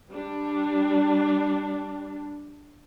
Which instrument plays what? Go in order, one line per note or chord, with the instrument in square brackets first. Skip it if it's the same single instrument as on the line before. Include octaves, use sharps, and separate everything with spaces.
[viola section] G3 D4